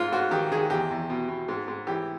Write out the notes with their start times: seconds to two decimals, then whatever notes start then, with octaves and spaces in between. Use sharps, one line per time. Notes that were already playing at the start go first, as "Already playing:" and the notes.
Already playing: G#2 F4
0.12 G#2 F#4
0.31 D#3 G4
0.52 D#3 G#4
0.70 E2 G4
0.90 E2
1.10 B2
1.28 B2
1.48 G#2
1.68 G#2
1.87 E3 G4